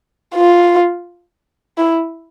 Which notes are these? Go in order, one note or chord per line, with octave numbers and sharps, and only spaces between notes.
F4
E4